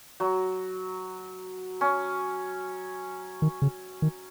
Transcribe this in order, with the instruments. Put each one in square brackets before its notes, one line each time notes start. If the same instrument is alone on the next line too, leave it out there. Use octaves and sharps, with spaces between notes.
[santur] F#3
C#4
[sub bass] D#3
C#3
D#3